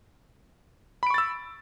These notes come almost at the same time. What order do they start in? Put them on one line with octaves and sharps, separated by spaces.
B5 D7 C#6 A6 E6